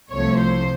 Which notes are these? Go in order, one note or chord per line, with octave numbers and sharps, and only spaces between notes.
C2 C3 F3 A3 C#5
C5